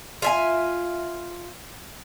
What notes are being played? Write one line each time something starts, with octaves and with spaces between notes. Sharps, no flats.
F4 E5 G#5